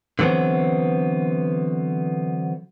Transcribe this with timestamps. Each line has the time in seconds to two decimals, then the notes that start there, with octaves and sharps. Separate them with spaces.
0.19 D3 E3 F#3 B3 C4